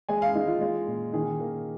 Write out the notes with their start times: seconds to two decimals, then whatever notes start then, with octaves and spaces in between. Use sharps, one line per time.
0.09 G#3 G#5
0.22 F5
0.35 G#3 D#4
0.48 F4
0.61 G#3
0.87 A#2
1.13 D#3 G#4
1.40 A#3